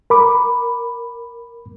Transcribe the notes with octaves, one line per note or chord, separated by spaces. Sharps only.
A#4 B5 D6